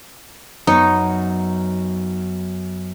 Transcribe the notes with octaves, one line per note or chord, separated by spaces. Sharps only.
F#2 B3 D#4 C#5